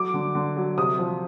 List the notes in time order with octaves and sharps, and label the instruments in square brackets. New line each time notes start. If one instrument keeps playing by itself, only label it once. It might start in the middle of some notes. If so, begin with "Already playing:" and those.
Already playing: [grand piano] F#3 [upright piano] D6
[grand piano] D3
D3
F#3
[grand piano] C3 [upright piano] D#6
[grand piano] F3